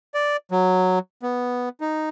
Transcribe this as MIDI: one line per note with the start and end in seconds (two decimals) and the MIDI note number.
0.14 0.37 74
0.51 0.99 54
1.23 1.69 59
1.81 2.09 63